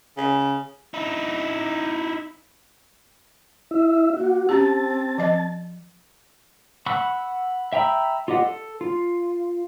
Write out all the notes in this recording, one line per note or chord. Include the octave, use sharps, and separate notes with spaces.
C#3
D#4 E4
E4 E5
A#3 F#4
C4 C#4 G4 A5
F3 D#5
F#5 B5 C#6 E6 F#6
E5 G5 A#5 B5 E6
F4 G4 D#5 F#5
A4
F4